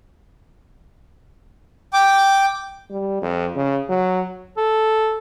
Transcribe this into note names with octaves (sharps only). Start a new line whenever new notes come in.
G5 D6
G3
F2
C#3
F#3
A4